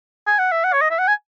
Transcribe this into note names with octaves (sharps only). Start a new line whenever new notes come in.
G#5
F#5
E5
F#5
C#5
D#5
E5
F#5
G#5